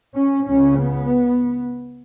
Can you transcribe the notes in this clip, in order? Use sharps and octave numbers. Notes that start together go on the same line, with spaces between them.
C#4
C#2 C#3 C#4
B3